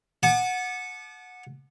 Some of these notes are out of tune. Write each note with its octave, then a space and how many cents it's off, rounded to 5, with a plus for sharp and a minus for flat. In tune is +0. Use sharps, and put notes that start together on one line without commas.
F#5 -15 A5 -40 D6 +40